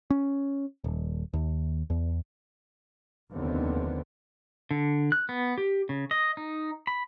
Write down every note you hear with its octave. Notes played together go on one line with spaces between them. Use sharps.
C#4
D#1
D#2
E2
F1 D#2 D3 B3 C4
D3
F#6
B3
G4
C#3
D#5
D#4
B5